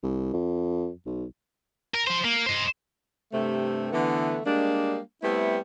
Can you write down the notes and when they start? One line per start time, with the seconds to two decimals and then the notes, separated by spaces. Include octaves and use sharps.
0.03 C2
0.34 F2
1.06 B1
1.94 A#4
2.07 F3 C5
2.24 A#3
2.46 C5 D#5
3.33 G2 C3 A3
3.93 D3 E3 A3 B3
4.46 G3 G#3 A#3 D4
5.23 G3 A3 B3 C4 E4